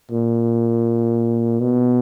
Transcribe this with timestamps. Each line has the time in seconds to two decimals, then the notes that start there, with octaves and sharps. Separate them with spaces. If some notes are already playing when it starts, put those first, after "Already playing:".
0.11 A#2
1.60 B2